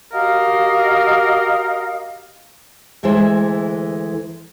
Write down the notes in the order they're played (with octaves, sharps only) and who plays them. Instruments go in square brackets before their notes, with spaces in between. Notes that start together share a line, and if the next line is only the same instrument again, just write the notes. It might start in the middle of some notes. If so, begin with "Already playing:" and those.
[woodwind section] F#4 G4 A#4 D#5 F5
[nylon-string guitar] D2 E3 G#3 A4 C5